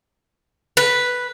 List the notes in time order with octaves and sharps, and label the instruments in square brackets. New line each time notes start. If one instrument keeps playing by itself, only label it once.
[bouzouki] B4